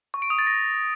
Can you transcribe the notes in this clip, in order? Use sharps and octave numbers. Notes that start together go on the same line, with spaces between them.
C#6
D7
D#6
A6
A#6